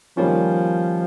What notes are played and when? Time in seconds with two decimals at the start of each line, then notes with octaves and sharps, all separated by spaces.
0.17 D#3 F3 G3 A#3 C#4